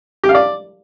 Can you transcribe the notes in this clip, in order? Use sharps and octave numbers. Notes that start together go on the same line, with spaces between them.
G4
F5
D5